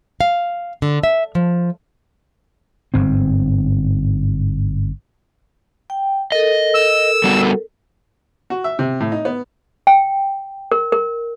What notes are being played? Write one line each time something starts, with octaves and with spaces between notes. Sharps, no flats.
F5
D3
E5
F3
G1 G#2 C4
G5
A4 A#4 D#5
E6
G3 B3 F#4
F#4
E5
C3
A2
D#4
B3
G5
A#4
A#4